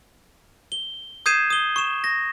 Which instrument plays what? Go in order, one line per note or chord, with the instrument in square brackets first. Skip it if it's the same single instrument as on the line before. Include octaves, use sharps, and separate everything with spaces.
[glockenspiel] G7
D#6 G6 G#6 C7 D#7 E7
D#6 G7
C#6 E7
A#6